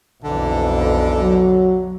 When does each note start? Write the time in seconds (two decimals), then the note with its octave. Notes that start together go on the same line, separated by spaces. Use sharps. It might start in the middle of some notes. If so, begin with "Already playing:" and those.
0.23 B1 F2 D3 E3
1.21 F#3